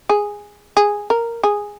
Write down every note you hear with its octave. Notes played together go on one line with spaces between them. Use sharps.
G#4
G#4
A#4
G#4